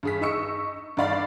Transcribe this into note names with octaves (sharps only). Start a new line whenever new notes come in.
G2 G#4 B6
D#4 D#5 C#6 E6 C#7
G2 D#4 D5 F5 B5 A6